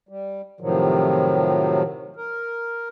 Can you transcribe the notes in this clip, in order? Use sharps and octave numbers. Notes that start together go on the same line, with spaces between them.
G3
A2 C3 D#3 F3 F#3
A#4